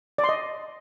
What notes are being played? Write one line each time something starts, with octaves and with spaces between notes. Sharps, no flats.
D5
C6
D#5